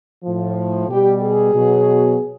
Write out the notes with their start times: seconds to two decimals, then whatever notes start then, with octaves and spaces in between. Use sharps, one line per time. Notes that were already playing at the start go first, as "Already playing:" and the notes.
0.24 A2 F3
0.88 B2 G3 G4
1.21 G#4
1.53 B2 F#3